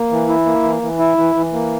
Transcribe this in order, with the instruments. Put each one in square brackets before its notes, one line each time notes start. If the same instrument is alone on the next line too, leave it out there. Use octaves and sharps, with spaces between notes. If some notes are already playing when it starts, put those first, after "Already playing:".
Already playing: [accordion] A#3
E3
E4
A#3
E3
E3
E4
E3
E3
A#3